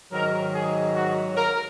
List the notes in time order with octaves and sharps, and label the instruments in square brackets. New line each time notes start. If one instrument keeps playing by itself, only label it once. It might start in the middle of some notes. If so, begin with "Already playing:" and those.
[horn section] G#2 D#3 F#3 A#4
G#4
F#4
A#4